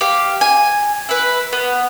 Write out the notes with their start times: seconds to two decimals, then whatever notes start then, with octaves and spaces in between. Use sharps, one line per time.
0.01 G4 F5
0.41 G#5
1.09 E4 B4
1.53 B3